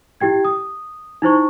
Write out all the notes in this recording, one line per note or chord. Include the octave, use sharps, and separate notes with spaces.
E4 G4 G5 G#6
D#6
D#4 E4 C5 C#6